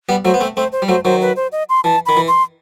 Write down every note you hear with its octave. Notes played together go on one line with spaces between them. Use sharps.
G3 B3
F#3 A3 C5
B3
A3 C4
A3 C4 C5
C5
G3
F#3 A3 C5
D#3 F#3 C5
B4
C5
D#5
C6
E3 A5
D#3 B5
E3
C6